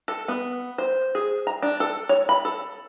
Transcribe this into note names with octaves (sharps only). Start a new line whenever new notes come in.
A4
B3
C5
G#4
A#5
D4
A4
C#5
B5
A4